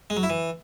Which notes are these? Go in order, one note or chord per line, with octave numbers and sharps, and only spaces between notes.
G#3
F#3
E4
E3